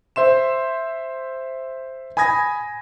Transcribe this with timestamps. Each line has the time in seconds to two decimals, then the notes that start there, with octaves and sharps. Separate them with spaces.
0.16 C5 E5 C6 E7
2.17 G#5 B5 D#6 G#6 A#6